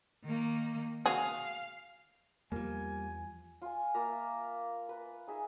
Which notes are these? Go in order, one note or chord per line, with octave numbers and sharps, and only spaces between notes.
D#3 A#3
F#4 G#4 F5
E2 F3 G3 A#3 G#5
F4 G#5
A#3 F4 E5 A#5
B4
D#4 G#4 E5